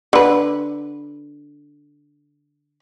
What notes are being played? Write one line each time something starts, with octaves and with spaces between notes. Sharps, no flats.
D3 B4